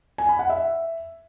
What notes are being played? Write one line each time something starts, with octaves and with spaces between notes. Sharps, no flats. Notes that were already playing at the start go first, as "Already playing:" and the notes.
G#5
B5
F#5
E5